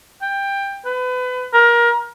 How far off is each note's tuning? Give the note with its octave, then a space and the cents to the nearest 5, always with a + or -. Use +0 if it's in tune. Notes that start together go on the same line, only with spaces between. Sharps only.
G5 +15
B4 +30
A#4 +25